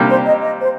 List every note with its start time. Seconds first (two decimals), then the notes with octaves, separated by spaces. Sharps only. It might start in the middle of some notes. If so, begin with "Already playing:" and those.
Already playing: C3 G3 A#3 D4 G4
0.09 C5
0.25 D#5
0.42 D#5
0.61 C5